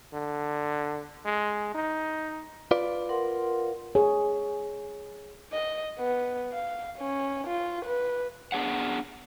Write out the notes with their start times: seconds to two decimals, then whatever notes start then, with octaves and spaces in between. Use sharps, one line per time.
0.13 D3
1.25 G#3
1.74 D#4
2.71 F4 B4 D5
3.09 A#4 F#5 C6
3.95 G#4 C#5
5.53 D#5
5.99 B3
6.53 F5
6.98 C#4
7.47 F4
7.85 B4
8.52 B3 D4 G#4 C#5 F#5